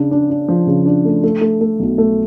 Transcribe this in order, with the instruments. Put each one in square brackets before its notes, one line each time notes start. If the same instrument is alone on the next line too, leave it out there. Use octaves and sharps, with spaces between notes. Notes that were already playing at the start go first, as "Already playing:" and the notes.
Already playing: [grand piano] C#3 D4
D4
D4
F3
C#3
D4
A3
A3
A3
A3
B1
A3